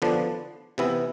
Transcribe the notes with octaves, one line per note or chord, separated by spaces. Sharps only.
D3 F3 B3 D4
C3 E3 B3 E4